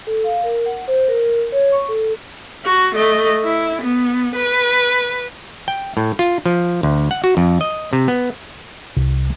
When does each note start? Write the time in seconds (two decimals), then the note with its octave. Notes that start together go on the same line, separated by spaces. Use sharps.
0.07 A4
0.24 F5
0.44 A#4
0.66 F#5
0.88 C5
1.08 A#4
1.52 C#5
1.72 C#6
1.89 A4
2.65 F#4
2.95 A3 D#5
3.45 E4
3.82 B3
4.35 B4
5.68 G5
5.97 A2
6.19 F4
6.46 F3
6.83 D2
7.11 F#5
7.24 F#4
7.37 F2
7.61 D#5
7.93 C3
8.08 B3
8.97 C2